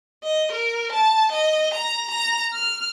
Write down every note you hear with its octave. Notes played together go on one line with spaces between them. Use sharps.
D#5
A#4
A5
D#5
A#5
A#5
F6